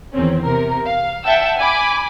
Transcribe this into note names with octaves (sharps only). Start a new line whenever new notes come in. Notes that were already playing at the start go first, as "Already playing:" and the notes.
E2 D#3 C4 C#4
C3 A#4
F5
E5 F#5 G5 A5 E6
G#5 B5 D6